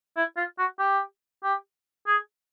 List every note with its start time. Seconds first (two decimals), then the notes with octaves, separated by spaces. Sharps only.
0.17 E4
0.37 F4
0.59 F#4
0.79 G4
1.44 G4
2.07 G#4